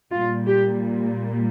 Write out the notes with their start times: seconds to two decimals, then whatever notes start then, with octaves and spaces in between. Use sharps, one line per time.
0.12 A#2 G3 F4
0.47 G4